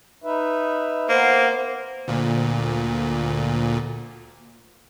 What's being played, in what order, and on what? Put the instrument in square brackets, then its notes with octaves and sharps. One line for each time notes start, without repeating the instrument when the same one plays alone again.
[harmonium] D#4 B4 E5
[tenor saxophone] A#3 [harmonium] B3 [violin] C5
[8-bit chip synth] D2 A#2